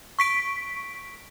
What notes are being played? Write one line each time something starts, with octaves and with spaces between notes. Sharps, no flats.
C#6 B6 D7